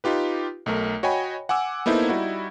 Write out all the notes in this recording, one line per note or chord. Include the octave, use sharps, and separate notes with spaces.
D#4 F4 G4 B4
B1 A3 A#4
F#4 C#5 D#5 G5 G#5 B5
F#5 G#5 D6 E6
A#3 B3 D#4 E4 A4 C5
G3 D#4 E4 F#4